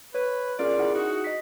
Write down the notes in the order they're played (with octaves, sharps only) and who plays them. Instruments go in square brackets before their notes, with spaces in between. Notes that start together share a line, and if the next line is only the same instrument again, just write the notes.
[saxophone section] B4 [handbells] C#5
[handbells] C#4 G#4 A#4 [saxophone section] F4 D5
[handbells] E4 G#4 F#5
[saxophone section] D#4 F#4
[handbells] D#5 B6